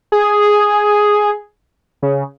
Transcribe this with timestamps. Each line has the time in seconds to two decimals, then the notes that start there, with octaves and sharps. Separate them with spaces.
0.12 G#4
2.02 C#3